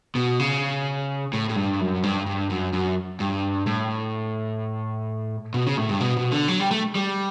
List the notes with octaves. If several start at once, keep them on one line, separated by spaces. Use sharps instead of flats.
B2
C#3
A2
A2
G2
F#2
G2
G2
F#2
F#2
G2
A2
B2
C#3
A2
G2
B2
B2
D3
F#3
G3
A3
G3